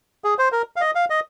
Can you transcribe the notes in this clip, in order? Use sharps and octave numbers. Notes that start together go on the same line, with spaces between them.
G#4
C5
A#4
F5
D#5
F5
D#5